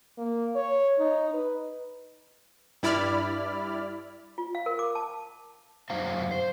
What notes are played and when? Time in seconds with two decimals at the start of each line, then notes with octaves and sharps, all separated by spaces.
0.17 A#3
0.55 C#5
0.99 D#4
1.33 B4
2.83 G2 E4 D5 B5 F6
4.38 F4
4.55 F5
4.66 A#4
4.79 D6
4.95 A5
5.90 F#2 G3 D#4 C5 F5 A#5
6.31 C5